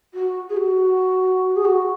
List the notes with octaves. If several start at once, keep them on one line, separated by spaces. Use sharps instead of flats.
F#4
G#4
F#4
G#4
F#4